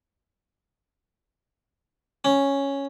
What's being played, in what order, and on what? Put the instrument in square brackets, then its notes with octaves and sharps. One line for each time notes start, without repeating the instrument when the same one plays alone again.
[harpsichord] C#4